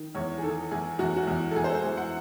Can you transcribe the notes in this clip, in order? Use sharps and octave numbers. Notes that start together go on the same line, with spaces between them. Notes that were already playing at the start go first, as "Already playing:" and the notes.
Already playing: D#3
E2 C#5
G#4
D#3 A4
E2 G#4
E2 F#4
F#4
E2
A4
E2 G#4
C5
A4
E2 G#4
F#5